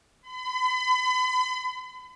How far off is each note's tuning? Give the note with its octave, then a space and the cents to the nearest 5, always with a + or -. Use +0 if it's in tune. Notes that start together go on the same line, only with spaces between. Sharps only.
B5 +40